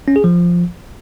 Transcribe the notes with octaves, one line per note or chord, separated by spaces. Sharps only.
C#4
G#4
F3